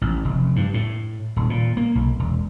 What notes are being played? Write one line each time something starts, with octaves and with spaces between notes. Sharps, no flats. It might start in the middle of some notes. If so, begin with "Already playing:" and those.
A1
F1
G2
A2
D#1
A#2
A#3
B1
E1